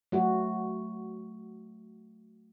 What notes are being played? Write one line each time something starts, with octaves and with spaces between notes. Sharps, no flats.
F#3 A3 F#4